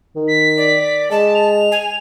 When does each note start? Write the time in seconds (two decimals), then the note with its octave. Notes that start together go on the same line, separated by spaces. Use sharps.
0.16 D#3
0.28 B6
0.57 D5
1.11 G#3 A5
1.35 F7
1.72 G#5